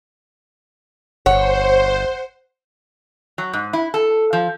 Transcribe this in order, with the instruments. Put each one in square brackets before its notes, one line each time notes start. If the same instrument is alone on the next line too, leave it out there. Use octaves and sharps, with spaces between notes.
[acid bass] G1 [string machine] C5 [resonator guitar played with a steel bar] C#5 [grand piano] F#5
[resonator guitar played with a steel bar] F#3
G#2
E4
A4
F3